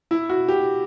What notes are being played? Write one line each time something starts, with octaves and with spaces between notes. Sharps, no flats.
E4
F#4
G4